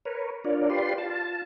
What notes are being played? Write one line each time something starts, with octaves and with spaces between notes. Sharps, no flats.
A#4 B4 C#5
D4 F4 A#4 C#5 D5
F4 G4 B4 D5 C6
F4 A5